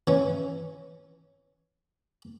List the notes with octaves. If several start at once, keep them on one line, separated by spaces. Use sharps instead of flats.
E3 C#4